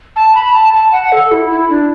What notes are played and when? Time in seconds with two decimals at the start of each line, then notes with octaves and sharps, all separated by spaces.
0.16 A5
0.35 B5
0.54 A5
0.73 A5
0.92 F#5
1.12 A4
1.32 E4
1.51 E4
1.70 D4